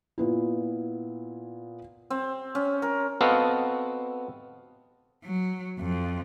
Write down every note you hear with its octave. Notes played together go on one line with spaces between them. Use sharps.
A#2 B3 E4
C4
C#4
A#4
B3 C4 F#4 A4 D#5 F5
F#3
F2